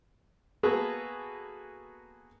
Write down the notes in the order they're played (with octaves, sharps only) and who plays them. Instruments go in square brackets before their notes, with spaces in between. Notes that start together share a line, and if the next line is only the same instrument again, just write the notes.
[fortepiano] A#3 B3 F#4 G#4 A4 B4